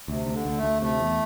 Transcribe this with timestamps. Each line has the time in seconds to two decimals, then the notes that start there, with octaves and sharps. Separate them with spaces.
0.08 D2 C3
0.27 D2
0.33 D3
0.45 D2
0.57 A3
0.63 D2
0.82 C3 A3
1.00 E2